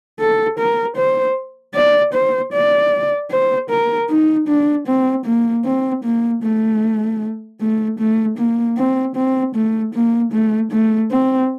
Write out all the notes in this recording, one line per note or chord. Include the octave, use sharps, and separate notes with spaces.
A4
A#4
C5
D5
C5
D5
C5
A#4
D#4
D4
C4
A#3
C4
A#3
A3
A3
A3
A#3
C4
C4
A3
A#3
A3
A3
C4